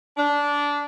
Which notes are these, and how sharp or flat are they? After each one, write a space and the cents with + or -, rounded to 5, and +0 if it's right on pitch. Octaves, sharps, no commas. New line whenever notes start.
D4 -15